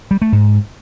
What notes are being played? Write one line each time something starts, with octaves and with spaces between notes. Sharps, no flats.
G3
A3
G#2